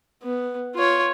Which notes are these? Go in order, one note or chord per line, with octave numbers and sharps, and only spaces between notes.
B3
F4 C#5